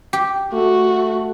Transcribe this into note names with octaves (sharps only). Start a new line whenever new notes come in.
G4
A3 F#4